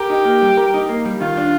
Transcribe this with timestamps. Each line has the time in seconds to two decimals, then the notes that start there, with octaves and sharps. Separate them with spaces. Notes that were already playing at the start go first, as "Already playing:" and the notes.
Already playing: G4 A#4
0.10 D#4
0.25 A#3
0.42 G3
0.57 A#4
0.74 D#4
0.89 A#3
1.05 G3
1.20 D#3 F4
1.37 D4